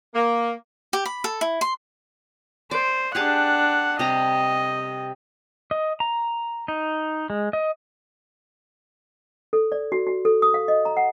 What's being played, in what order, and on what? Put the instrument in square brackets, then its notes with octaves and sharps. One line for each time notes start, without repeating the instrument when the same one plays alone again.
[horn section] A#3
[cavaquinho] G4
B5
A4
E4
C6
[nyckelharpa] C5 [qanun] D5
[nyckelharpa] D4 F#5 [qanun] G4 G#4 A5
[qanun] C3 G3 A#5 [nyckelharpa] D#5
[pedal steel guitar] D#5
A#5
D#4
G#3
D#5
[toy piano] A4
D5
F#4
F#4
A4
D#6
F5
D#5
A#5
F#5